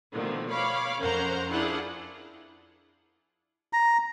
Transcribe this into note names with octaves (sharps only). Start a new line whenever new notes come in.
B2 D3 D#3 F3 A3
C#5 F5 B5 D6
F2 C#4 A#4 C5 F#5 A#5
D4 E4 F4 G#4 F#5
A#5